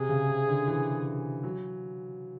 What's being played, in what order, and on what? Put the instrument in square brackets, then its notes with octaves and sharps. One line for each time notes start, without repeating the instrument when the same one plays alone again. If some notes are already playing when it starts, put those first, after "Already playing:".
Already playing: [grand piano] C3 [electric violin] G#4
[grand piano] C#3
C3
D3
E3
F#3